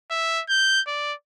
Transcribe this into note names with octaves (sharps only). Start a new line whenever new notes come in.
E5
G6
D5